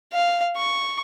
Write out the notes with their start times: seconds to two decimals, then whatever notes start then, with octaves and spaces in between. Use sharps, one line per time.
0.13 F5
0.57 C#6